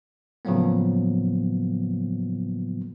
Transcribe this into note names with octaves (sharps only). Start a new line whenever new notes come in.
A2 C#3 F3 F#3 A#3 B3